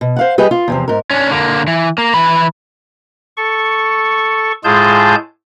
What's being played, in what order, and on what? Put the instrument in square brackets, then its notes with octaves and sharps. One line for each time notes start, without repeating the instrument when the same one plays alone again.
[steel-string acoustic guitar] B2
C5 F5 F#5
G3 G4 G#4 B4 D#5
F4
E2 C3 F3
G#2 A#4
[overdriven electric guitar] C#4 D4
D3 A#3
E3
A#3
E3 B5
[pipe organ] A4 C#6
A2 G#3 F4 G#4 A5 G6